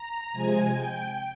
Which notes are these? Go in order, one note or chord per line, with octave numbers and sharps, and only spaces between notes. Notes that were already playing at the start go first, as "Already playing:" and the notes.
Already playing: A#5
C3 F3 G#3 G#5
G5